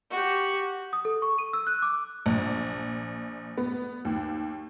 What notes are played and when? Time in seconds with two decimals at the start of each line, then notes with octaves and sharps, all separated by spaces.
0.10 F#4 G4
0.93 D#6
1.05 A4
1.22 C#6
1.38 D#7
1.53 E6
1.67 F#6
1.82 D6
2.26 A#1
3.57 B3
4.05 D#2